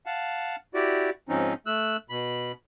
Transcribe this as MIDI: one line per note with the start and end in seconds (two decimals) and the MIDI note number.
0.06 0.56 77
0.06 0.56 78
0.06 0.56 81
0.74 1.10 64
0.74 1.10 66
0.74 1.10 67
0.74 1.10 74
1.29 1.54 44
1.29 1.54 53
1.29 1.54 60
1.29 1.54 61
1.29 1.54 63
1.66 1.97 57
1.66 1.97 88
1.66 1.97 90
2.10 2.52 47
2.10 2.52 83